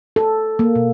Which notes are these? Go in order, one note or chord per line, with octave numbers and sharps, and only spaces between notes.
A4
A#3
B2